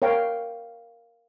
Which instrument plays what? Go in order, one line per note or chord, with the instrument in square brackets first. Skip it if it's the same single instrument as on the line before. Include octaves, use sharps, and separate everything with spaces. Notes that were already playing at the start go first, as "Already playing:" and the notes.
[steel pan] A#4 C#5 F5 G5